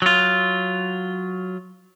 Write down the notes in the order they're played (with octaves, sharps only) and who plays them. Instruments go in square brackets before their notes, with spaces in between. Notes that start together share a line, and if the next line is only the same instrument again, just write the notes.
[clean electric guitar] F#3 F4